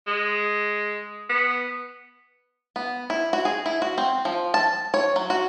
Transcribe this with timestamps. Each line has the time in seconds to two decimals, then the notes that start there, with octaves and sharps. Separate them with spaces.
0.07 G#3
1.29 B3
2.76 B3
3.10 E4
3.33 F#4
3.45 G#4
3.66 E4
3.82 F#4
3.98 C4
4.25 F3
4.54 A5
4.94 C#5
5.16 F#3
5.30 F#4